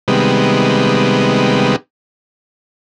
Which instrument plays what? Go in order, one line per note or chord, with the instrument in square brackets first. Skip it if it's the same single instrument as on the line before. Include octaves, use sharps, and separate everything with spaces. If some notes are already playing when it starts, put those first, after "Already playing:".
[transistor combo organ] C3 D#3 G3 G#3 B3